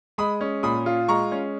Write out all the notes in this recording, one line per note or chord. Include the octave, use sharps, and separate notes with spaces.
G#3 B5 D#6
C#4
A#2 B5 D#6
F4
G#3 A#5 C#6
C#4